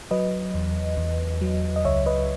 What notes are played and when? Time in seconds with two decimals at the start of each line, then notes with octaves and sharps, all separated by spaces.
0.11 F#3 B4 D#5
0.55 E2
0.97 E2
1.41 F#3
1.76 D#5
1.85 C#2 C#5 E5
2.06 B4 D#5